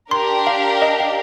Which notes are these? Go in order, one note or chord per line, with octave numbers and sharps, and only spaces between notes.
D4 G4 A#4 C6
F5
D#5
F5